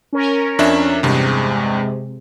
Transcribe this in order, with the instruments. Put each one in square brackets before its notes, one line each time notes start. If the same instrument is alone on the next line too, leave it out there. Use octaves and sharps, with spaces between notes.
[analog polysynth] C#4 A#4
[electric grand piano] F2 D4 E5
[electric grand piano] E2 G2 [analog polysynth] C3 G#3